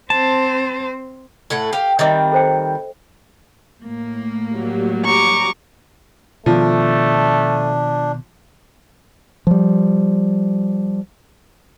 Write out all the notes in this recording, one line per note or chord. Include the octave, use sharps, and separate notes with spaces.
C4 C5 A5
A2 A3 F#5
G4 F5
D#3 G3 C4 D#5 E5 D6
A4 C5 G5
A2 A#3
F#3 G3
A#5 C#6 D6
B2 D#3 F3 A3 B3 D4
F3 G3